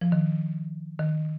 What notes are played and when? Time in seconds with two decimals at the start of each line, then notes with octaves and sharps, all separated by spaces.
0.01 F3
0.12 D#3
0.99 D#3